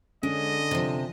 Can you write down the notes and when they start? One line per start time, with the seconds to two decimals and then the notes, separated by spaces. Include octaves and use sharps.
0.23 D3 G#3 C#4 D#5
0.71 C3 F3